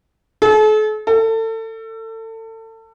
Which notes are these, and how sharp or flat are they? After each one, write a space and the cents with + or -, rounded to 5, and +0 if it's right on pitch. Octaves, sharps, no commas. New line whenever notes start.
A4 -40
A4 +30